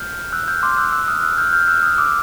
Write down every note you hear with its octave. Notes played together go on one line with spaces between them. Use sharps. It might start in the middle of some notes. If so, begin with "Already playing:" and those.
Already playing: F6 G6
E6 F#6
F6 G6
C6 D6
E6 F#6
E6 F#6
D#6 F6
E6 F#6
F6 G6
F6 G6
E6 F#6
D#6 F6
D6 E6